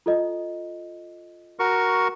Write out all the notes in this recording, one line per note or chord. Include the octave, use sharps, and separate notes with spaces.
F4 A4 D#5
F#4 A#4 C#6